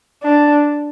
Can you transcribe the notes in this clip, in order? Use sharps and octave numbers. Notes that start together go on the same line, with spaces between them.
D4